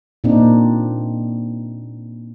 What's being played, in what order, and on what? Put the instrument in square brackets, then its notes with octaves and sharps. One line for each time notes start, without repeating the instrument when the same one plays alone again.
[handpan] A#2 A#3 C4 D4 D#4